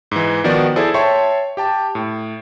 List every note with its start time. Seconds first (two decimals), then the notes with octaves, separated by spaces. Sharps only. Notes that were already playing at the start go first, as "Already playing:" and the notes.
0.11 G#2 E3
0.44 D#3 F3 B3 F#4 D5
0.76 E4 G#4 A4 C5 D5
0.94 C#5 E5 G5 A5 C6 C#6
1.57 G4 G5 A5
1.95 A2